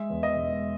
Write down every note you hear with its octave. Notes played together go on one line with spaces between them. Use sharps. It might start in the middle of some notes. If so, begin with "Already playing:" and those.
Already playing: G#3 E5
E2
D#5
E1